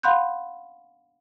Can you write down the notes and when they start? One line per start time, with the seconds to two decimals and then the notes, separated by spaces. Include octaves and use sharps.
0.03 F5 F#5 B5 C6 F#6 G6